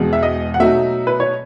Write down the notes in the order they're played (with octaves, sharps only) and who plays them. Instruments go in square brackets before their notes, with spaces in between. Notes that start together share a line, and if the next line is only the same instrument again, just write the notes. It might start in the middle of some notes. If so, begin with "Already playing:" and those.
Already playing: [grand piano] E1 E2 B2 G#3
[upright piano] E5
D#5
F#5
[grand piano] B2 F#3 A3 D#4 F#4 [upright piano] E5
[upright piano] B4
C#5